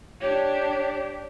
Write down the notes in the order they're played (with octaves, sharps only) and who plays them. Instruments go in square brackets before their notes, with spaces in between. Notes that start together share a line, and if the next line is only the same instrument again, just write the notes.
[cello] D4 G4 [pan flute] C#5